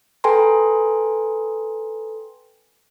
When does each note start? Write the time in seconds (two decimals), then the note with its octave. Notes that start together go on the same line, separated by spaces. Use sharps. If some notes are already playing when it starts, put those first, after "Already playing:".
0.24 A4 B4 G5 G#5 A#5 C6